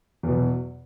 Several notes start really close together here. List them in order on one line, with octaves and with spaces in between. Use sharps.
E2 B2 F#3